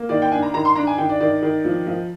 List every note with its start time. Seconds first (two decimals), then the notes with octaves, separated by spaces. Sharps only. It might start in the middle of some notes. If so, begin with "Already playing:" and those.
Already playing: A#3
0.09 D#3 D5
0.22 G5
0.32 D4 G#5
0.42 A#5
0.54 D#3 A#5
0.65 C6
0.75 D4 A#5
0.87 G#5
0.98 D#3 G5
1.09 D5
1.20 D#3 D5
1.42 D#3
1.65 F3
1.87 F3